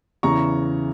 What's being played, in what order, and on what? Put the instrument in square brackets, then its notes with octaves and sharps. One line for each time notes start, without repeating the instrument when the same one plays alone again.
[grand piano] E2 C#3 E3 A#5 C#6